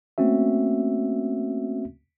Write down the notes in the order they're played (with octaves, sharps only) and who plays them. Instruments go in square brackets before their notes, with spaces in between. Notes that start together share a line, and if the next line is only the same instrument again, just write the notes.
[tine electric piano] A3 A#3 C4 C#4 F#4 E5